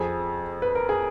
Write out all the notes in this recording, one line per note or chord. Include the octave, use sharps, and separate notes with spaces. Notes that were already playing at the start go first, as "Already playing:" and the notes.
Already playing: F2 F3 G#4
B4
A#4
G#4